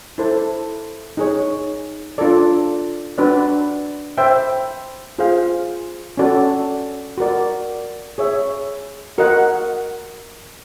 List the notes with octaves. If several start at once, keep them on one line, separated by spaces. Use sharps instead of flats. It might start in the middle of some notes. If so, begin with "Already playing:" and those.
E4 A4 C5
D#4 G#4 C#5
D4 F4 A4 D5
D4 F#4 B4 D5
C5 E5 G5
F4 G#4 C5 F5
C#4 F#4 A4 D5
F#4 A#4 D5
G#4 C#5 E5
F#4 A#4 D#5 F#5